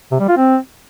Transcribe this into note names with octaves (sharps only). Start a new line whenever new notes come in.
C3
G3
F4
C4